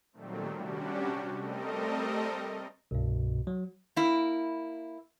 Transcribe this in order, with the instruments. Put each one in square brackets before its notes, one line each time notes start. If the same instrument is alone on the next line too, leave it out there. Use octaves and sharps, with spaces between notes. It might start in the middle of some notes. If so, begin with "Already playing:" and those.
[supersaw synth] A#2 D#3 F#3 G3 A3 C4
C3 G3 C#4 D4 F#4 G4
G3 A3 C4 A4 A#4 D#5
[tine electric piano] C2 G2 [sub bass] B2
[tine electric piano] F#3
[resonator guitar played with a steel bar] A#3 E4